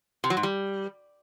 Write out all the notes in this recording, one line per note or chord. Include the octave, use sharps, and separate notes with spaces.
C3
F#3
G#2
G3